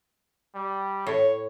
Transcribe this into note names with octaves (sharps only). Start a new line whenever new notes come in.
G3
A2 C#5